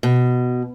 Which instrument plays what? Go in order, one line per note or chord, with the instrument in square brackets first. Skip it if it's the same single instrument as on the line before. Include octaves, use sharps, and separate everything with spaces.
[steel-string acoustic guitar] B2